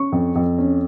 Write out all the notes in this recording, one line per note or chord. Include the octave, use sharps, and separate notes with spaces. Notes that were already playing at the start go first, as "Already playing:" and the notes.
Already playing: C#4 C#6
F2
F2
C#4